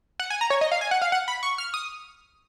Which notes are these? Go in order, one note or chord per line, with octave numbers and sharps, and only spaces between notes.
F#5
G#5
A#5
C#5
D#5
F5
G#5
F#5
F5
F#5
B5
C#6
F6
D#6